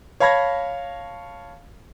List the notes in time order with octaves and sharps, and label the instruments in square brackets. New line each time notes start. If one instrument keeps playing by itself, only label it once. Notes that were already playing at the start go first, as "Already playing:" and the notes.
[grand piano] C#5 F5 A5 B5 G#6 A#6